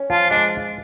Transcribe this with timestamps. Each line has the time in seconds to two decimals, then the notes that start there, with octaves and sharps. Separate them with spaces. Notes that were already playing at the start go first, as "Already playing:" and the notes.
Already playing: C#4
0.10 F3 F4
0.30 G#3 D4